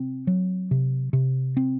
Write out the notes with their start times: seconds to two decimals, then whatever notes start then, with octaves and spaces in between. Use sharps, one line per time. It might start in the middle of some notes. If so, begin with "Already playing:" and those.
Already playing: C3 C4
0.27 F#3
0.71 C3
1.13 C3
1.57 C4